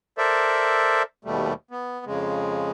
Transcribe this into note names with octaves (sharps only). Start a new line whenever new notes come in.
A4 A#4 C5 D5 E5
D#2 B2 G3 A3
B3
F2 C#3 G#3